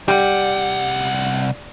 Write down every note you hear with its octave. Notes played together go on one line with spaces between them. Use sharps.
C2 G3 F#5